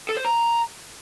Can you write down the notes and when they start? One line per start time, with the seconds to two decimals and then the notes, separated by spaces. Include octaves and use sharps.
0.09 A4
0.17 C5
0.25 A#5